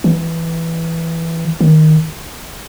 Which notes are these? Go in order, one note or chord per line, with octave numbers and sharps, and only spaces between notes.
E3
D#3